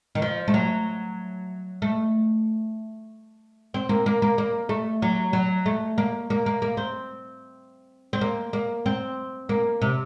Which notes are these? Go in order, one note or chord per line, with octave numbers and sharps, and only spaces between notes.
D#3
F3
A3
F#3
A3
C4
A#3
A#3
A#3
A#3
A3
F#3
F#3
A3
A#3
A#3
A#3
A#3
C4
C4
A#3
A#3
C4
A#3
C3